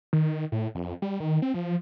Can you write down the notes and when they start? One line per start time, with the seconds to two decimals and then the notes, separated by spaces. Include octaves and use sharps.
0.13 D#3
0.52 A2
0.75 F2
1.02 G3
1.20 D#3
1.42 C4
1.54 F3